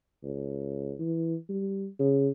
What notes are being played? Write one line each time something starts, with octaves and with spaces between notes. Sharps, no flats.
C#2
E3
G3
C#3